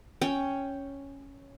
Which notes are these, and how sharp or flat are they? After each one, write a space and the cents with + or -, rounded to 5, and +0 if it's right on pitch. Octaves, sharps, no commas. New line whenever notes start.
C#4 +0 G5 +0